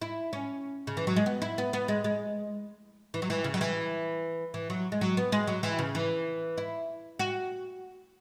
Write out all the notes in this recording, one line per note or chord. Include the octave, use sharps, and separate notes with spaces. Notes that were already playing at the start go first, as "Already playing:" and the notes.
E4
C#4
C#3
E3
F#3
G#3
B3
E4
B3
B3
G#3
G#3
E3
F#3
E3
C#3
F#3
E3
E3
F#3
G#3
F#3
B3
G#3
F#3
E3
C#3
E3
E4
F#4